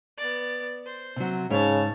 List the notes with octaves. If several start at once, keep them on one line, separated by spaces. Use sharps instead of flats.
B3 D5
C5
C3 F#3
G#2 C#3 C#5 A5